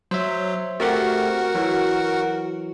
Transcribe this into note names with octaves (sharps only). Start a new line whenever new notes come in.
F#3 C5 E5
A3 C4 F#4 G4 A#4 F#5
E3 F#3